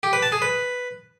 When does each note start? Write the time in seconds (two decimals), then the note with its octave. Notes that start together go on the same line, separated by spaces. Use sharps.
0.03 G4
0.13 B4
0.23 A5
0.32 G#4
0.42 B4